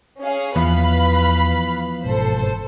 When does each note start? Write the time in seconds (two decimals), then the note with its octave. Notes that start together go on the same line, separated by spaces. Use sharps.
0.19 C#4 G#4 F5
0.56 E2 E3 F3 B3 B4 F5 B5
2.04 G1 G#2 B2 A4 C5